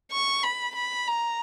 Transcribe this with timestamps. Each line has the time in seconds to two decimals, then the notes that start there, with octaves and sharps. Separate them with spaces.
0.12 C#6
0.43 B5
0.76 B5
1.08 A#5